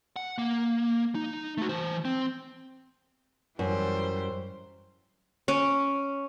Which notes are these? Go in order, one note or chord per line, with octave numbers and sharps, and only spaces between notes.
F#5
A#3
D#4
A3 F#4
E3 C5
C4
F#2 E3 G3 C5
C#4 D6